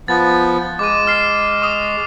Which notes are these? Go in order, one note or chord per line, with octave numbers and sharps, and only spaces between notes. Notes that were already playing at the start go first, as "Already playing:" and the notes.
F3 B3 A6
G#3 D6 D#7
F6 C7
C#6 D#6